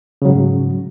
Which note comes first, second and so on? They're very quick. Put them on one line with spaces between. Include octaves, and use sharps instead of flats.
C#3 F#3 G#2